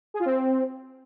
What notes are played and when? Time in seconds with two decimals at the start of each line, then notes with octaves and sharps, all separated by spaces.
0.14 G#4
0.20 F4
0.25 C4